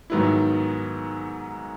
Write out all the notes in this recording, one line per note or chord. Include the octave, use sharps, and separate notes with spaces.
G#2 D#3 F#3 B3 E4